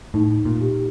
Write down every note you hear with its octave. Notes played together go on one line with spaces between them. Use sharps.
A2 D#4
A#2
G4